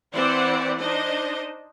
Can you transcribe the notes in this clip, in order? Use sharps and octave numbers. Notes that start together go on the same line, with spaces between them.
E3 C4 B4 C5 D5 F#5
D4 D#4 C5 D#5